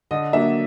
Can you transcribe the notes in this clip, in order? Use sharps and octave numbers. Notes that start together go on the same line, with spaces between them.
D3 D#5
F#3 A#3 D4 E5